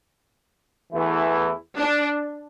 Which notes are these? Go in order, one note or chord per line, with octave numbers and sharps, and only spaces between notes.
E2 E3 A3 E4
D4